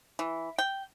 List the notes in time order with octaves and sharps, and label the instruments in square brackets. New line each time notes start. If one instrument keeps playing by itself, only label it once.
[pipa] E3
G5